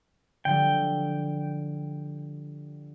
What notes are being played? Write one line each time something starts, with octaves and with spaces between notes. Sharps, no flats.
D3 F3 G3 G5